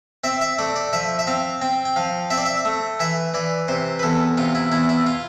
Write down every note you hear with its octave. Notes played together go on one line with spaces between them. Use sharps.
C4 E5
E5
A3 D5
D5
F3 E5
E5
C4 F5
C4 G5
G5
F3 F5
C4 E5
D5
E5
A3
E3 E5
E3 D5
C3 C5
B4
E2 A4
C3 F4
E4
E2 E4
E4
F4